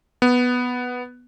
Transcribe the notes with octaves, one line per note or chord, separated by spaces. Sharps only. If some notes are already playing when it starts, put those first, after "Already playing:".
B3